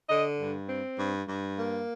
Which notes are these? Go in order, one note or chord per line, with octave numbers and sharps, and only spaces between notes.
D3 D#5
G2
C4
G2
G2
A#3